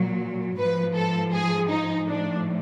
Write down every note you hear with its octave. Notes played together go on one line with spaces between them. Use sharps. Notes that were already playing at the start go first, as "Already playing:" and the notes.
Already playing: A#2 F#3
G#2 F3 B4
A4
G#4
D#4
A2 F3 D4